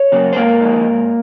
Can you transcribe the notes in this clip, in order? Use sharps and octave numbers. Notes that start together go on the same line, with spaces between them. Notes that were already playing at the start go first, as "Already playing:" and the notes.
Already playing: C#5
C#3 F#3 A#3
C5
G#2 A#3 A#4
F3 G#3 D#4
G#2